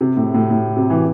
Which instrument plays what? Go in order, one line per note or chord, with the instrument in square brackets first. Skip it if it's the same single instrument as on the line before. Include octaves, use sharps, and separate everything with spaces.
[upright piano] C3
A2
A2
A2
C3
E3